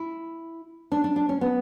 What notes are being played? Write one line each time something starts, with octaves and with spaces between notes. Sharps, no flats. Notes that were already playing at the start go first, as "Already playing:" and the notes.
Already playing: E4
D4
D4
D4
C#4
B3